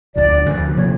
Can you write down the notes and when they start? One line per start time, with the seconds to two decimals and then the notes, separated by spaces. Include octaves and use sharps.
0.15 D2 D3 F3 D5
0.46 D2 D3 F3
0.76 C3 F3 A#3 C#5